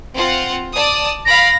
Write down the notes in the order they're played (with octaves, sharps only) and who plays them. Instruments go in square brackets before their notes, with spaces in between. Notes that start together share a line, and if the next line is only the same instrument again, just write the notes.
[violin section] C4 F4 F#5
D5 A5 D#6
[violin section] F5 B5 D7 [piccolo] A#6